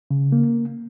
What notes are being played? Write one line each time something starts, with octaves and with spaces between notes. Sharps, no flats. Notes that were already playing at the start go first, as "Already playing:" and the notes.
C#3
A#3